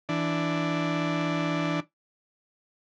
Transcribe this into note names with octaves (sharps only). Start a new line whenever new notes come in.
E3 D4